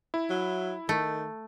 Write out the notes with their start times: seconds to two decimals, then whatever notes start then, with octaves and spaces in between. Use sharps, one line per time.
0.14 E4
0.30 F#3
0.89 D#3 A3